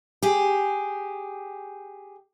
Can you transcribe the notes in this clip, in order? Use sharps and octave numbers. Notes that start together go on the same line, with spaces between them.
G4 G#4